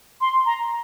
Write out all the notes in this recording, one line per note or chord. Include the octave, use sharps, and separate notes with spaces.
C6
A#5